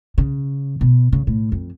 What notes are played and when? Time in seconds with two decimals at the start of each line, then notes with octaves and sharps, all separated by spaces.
0.18 C#3
0.81 B2
1.12 C#3
1.27 A2
1.52 F2